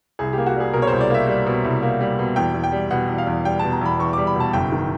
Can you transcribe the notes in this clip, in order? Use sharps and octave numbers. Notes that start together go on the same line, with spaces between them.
C2 G#4
G4
A#3
F#4
G3 G#4
B2 A#4
C#5
C2 C5
D5
A#3 E5
G3
B2
C2
A#3
G3
B2
E2 G5
E2
G5
G3
B2 F#5
E2
F5
E2
G3 G5
B2 A5
A#5
E2 B5
E2 C#6
G3 D6
B5
B2 A5
F#1 G5
D#3